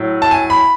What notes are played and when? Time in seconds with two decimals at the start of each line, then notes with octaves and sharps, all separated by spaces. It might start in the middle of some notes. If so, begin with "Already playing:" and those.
Already playing: A2 F#3
0.22 A5
0.31 G#5
0.50 B5